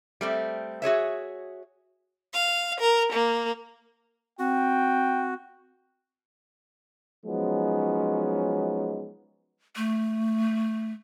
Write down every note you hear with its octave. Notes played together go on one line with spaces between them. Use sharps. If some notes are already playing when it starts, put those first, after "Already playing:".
G3 A3 C4
F#4 G#4 C#5 E5
F5
A#4
A#3
C4 F#4 G5
F3 F#3 G#3 B3 C#4 D#4
A3